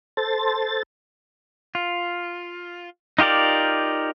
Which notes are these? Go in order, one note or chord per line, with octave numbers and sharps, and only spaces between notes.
A4 C5 A6
F4
D#4 F4 G4 A#4 D5